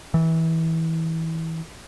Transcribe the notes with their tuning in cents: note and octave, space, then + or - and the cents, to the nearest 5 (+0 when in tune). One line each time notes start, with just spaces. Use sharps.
E3 -25